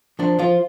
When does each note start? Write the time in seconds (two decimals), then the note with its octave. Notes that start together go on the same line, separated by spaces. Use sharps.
0.19 F3 D4
0.39 F3 F4